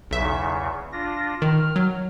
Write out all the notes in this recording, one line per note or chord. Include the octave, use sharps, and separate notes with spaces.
B1 E2 C#3 E5
D4 F4 A#6
D#3 F6
F#3